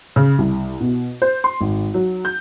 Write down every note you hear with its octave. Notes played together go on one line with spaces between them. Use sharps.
C#3
C2
B2
C5
C6
G#1
F#3
G6